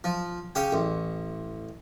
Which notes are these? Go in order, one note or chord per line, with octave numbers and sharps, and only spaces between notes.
F3
C#3 G4 G5
A1